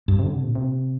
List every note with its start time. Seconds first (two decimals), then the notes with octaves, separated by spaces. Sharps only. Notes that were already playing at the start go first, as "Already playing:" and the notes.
0.08 G2
0.19 C3
0.23 D3
0.34 C3
0.44 A#2
0.55 C3